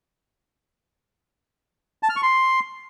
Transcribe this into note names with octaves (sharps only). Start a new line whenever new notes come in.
A5
F6
C#6
C6